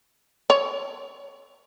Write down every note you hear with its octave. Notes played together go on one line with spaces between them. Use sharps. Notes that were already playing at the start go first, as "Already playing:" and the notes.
C#5